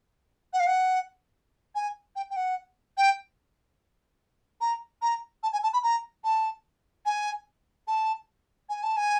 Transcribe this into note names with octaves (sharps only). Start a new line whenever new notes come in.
F#5
F5
F#5
G#5
G5
G5
F#5
G5
A#5
A#5
A5
G#5
A5
B5
A#5
A5
G#5
A5
G#5
A5
G#5